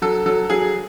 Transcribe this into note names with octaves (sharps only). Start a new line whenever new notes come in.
F#3 A4
F#3 A4
F#3 G#4